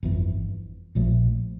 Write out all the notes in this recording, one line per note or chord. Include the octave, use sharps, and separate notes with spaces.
G1 F2 E3
A#1 A#2 F3 A3